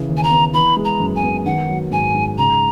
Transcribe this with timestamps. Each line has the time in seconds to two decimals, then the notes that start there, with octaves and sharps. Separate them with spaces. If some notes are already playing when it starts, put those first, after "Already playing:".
Already playing: C#3 E3
0.09 D#2
0.17 G#5
0.23 A#5
0.31 B3
0.54 E3 B5
0.77 G#3
0.85 A#5
1.00 F#2
1.16 G#5
1.23 B3
1.46 D#3 F#5
1.69 F#3
1.91 G#2 G#5
2.14 G#2
2.38 C#3 A#5